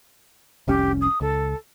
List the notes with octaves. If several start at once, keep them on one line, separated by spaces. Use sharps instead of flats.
F1 C2 C#4 G4
D#6
C#2 A4